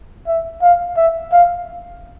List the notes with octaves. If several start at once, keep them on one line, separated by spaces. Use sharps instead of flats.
E5
F5
E5
F5